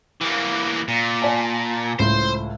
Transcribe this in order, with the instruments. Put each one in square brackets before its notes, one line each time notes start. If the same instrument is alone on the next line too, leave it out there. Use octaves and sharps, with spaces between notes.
[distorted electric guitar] E3 A#3
A#2
[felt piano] D5 G#5 A5
[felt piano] C#2 A2 [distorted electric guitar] C5